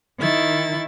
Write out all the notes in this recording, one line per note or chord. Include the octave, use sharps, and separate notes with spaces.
D#3 E4 A6